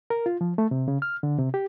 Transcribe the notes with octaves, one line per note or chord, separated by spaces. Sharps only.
A#4
F4
F3
A3
C3
C#3
F6
D3
C3
G4